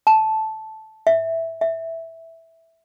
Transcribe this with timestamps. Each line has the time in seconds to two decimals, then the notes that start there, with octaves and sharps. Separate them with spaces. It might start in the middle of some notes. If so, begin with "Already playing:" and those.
0.07 A5
1.07 E5
1.61 E5